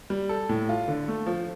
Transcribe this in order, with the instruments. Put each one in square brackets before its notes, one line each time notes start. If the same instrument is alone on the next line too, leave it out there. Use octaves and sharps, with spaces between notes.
[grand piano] G3
A4
A2
F4
D3
A3
F3